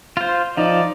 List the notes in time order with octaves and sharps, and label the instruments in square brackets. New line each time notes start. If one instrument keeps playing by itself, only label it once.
[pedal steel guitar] F4 C5
[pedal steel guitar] F3 [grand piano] D#4 [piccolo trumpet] D5